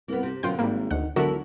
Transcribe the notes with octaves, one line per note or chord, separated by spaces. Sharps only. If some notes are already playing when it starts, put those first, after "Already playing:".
C2 A#3 B3
C3
F#2 B2 D3 F4 G5
G#1 G#2 G3 A#3 C4 E4
D2 D#3 F#5
E1 D3 F#3 E4 F#4 A4 A#4